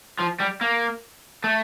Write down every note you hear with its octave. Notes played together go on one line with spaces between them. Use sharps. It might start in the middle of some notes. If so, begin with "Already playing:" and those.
F3
G3
A#3
A3